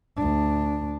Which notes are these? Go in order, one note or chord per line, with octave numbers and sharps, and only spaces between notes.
D2 D4